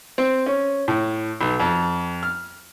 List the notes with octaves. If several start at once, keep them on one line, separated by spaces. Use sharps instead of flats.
C4
C#4
A2
B1
F2
F6